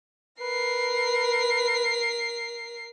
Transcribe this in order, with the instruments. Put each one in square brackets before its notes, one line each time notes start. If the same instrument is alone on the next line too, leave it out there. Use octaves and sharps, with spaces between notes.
[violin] A#4 C7 [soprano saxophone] B4